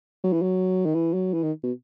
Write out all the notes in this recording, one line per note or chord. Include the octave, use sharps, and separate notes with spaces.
F#3
E3
F#3
D#3
E3
F#3
E3
D#3
B2